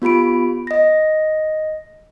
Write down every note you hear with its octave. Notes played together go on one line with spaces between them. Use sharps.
B3 F4 G4 B5 D7
D#5 A#6